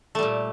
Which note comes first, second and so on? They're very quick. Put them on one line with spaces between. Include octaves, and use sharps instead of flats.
A3 G3 A#2